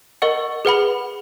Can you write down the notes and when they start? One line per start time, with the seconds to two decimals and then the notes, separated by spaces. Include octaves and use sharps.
0.22 A#4 D#5 F#5 C#6
0.65 G#4 B4 F#5 B5